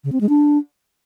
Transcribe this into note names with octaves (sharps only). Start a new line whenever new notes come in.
C#3
C4
G#3
D4